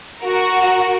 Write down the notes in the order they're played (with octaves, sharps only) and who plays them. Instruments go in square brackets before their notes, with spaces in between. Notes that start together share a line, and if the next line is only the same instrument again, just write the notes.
[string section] F#4 A#4